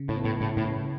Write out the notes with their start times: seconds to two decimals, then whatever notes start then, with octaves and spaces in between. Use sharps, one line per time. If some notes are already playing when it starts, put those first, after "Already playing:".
Already playing: C#3
0.09 A2
0.17 B3
0.25 A2
0.41 A2 C#3
0.57 A2
0.66 C#3